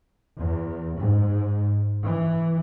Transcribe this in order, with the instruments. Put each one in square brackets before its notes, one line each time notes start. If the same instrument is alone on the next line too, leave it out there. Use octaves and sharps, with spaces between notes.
[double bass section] E2
G#2
E3